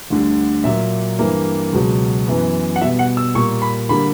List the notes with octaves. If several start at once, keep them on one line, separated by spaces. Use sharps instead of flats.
D2 D3 G3
A#2 F#3 A#3 E5
G2 E3 G3 A#3
C#2 B2 F#3 B3
F#2 E3 B3
F#5
B2 G3 B3 E5
F#5
E6
A#2 G3 A#3 C#6
B5
D3 G3 A#3 B5